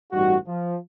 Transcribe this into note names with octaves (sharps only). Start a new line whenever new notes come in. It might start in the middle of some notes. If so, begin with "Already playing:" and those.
A1 G2 G3 D#4 F#4
F3